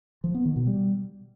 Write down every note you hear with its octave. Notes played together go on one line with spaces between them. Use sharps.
F3
B3
D#3
B2
G3